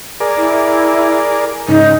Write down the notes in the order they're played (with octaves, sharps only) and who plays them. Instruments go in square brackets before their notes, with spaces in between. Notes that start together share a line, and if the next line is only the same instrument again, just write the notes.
[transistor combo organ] G#4 A#4 D5
[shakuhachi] E4
[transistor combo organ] G#2 C#3 [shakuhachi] D#4